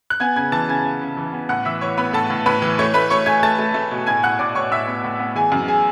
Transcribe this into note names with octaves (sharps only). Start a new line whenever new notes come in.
F#6
B3 G#5 G#6
C#3 G#5 G#6
E3 A5 A6
C#3 G#5 G#6
C#3
C#3
E3
B3
A2 F#5 F#6
E3 E5 E6
E3 C#5 C#6
B3 B4 B5
A2 A4 A5
A2
A2 B4 B5
E3
A3 C#5 C#6
A3 B4 B5
A3 C#5 C#6
A3 G#5 G#6
A3 A5 A6
A3
A3
B2
A2 G#5 G#6
A2 F#5 F#6
A2 D5 D6
A2 C#5 C#6
A2 E5 E6
B3
A2
B3
E3 G#4 G#5
F#2
G#4 G#5